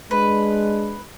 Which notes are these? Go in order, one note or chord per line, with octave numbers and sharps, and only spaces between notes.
G#3 D4 B4